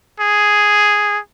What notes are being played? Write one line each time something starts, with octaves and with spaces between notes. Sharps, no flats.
G#4